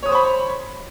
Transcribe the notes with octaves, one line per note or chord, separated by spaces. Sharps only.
C5 C#5 B5 C#6 D#6